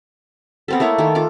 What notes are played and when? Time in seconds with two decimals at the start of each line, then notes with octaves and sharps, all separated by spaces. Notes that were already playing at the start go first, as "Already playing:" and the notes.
0.68 B3 C4 A4
0.80 A3 A#3 E4 C#5
0.98 D#3 A4
1.15 F4 A4 D6